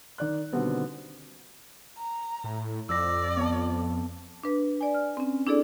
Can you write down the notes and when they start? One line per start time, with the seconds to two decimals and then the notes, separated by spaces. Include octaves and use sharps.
0.18 D#3 D5 F#6
0.53 B2 D3 D#3 G3 B3 C4
1.98 A#5
2.44 A2
2.89 F2 D5 E6 A#6
3.37 B3 A5
4.43 D4 B4
4.81 D5 G#5
4.94 F6
5.17 C4 C#4
5.46 D4 E4 G#4 A4 D5